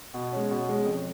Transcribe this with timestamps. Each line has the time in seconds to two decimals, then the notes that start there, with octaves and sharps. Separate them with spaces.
0.14 B2
0.32 G#3 C#4
0.51 B2
0.69 G#3 C#4
0.86 F2